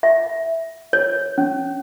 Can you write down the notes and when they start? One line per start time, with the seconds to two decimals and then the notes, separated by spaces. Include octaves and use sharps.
0.03 E5
0.93 C#5
1.38 C#4